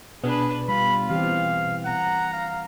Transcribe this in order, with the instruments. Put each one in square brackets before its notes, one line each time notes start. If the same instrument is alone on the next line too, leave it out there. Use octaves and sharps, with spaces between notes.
[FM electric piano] B2 B3 [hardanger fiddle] D4 B4 [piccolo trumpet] G#4
[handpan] G3 [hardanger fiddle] F4 [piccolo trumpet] B5
[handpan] E3 C4 G4 [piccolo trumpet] F5
[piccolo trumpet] F#5 [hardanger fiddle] A#5
[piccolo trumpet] F5